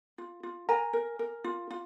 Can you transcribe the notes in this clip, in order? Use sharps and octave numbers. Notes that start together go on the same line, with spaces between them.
F4
F4
A#4 G#5 A#5
A#4
A#4
F4
F4